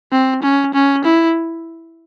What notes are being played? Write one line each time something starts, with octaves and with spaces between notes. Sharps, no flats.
C4
C#4
C#4
E4